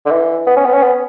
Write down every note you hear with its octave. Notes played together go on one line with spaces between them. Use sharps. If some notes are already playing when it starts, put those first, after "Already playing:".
D3
E3
B3
C#4
B3
C#4
B3